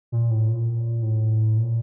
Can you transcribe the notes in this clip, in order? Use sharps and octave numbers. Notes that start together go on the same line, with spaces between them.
A#2
A2
A#2
A2
A#2